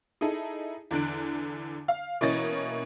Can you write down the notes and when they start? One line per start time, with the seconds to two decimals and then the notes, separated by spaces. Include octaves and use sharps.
0.21 D#4 E4 G#4 A4
0.91 E2 D3 F#6 D7
1.88 F5
2.21 B2 E3 A#3 C#4 D#5 A6